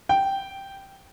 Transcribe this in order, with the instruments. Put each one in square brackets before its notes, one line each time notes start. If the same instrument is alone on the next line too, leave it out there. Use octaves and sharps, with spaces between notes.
[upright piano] G5